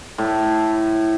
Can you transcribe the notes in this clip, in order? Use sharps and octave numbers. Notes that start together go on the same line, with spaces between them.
A2